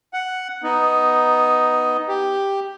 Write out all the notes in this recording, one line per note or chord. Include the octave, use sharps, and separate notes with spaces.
F#5
B3 D#4
G4